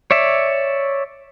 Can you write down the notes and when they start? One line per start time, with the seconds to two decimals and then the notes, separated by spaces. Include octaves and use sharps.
0.11 C#5 D5 E5